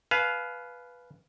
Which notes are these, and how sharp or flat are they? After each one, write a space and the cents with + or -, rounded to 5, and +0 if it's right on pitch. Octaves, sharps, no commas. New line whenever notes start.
B4 +0 F5 +0 G#5 +45